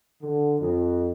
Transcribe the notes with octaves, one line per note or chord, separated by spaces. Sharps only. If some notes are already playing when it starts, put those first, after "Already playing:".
D3
F2